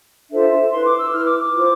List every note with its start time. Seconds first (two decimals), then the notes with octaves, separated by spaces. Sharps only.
0.30 D4 F4 A4 C5 E5
0.71 E4 B4 C6
0.85 D6
0.98 E6
1.12 E4 B4 F6
1.26 D6
1.40 D6
1.54 F4 C5